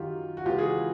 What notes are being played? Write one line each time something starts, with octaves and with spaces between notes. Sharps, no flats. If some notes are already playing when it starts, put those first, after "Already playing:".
Already playing: F#2 D#3 F#3 F4 G4
F#4
C#2 C#3 E3 F4 G4
F#4 G#4